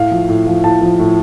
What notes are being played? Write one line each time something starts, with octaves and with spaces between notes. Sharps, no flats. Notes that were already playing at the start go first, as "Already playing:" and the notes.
Already playing: A2 F5
F3
A2
F3
A2 A5
F3
A2